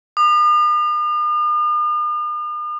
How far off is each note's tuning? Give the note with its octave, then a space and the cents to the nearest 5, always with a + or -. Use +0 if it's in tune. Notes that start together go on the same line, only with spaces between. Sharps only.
D#6 -45